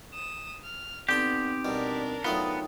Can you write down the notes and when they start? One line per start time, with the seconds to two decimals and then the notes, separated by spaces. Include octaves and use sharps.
0.14 D#6 E7
0.64 F6
1.09 D3 B3 C4 D#4 G4 G5 A5
1.65 B2 G3 D4 A#4
2.25 F#3 A3 B3 D#4 F4 G5 D#6